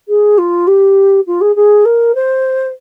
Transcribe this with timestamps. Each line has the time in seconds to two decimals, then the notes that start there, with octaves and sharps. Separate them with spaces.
0.08 G#4
0.38 F4
0.67 G4
1.26 F4
1.41 G#4
1.56 G#4
1.85 A#4
2.15 C5